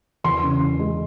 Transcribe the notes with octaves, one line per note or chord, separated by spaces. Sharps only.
E2 C6
C#3
E2
G#3